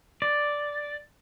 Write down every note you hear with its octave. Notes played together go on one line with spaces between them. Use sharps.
D5